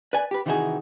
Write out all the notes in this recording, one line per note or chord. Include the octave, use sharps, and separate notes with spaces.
B4 D5 G#5
G4 B4
C3 D#3 E3 D#4 F#4 G#4